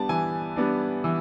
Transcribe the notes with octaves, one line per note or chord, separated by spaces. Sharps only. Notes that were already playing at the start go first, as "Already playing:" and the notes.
Already playing: G3 B3 D4 A5
E3 G#5
G3 B3 D4
E3